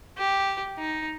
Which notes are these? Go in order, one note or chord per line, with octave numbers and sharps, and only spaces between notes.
G4
D#4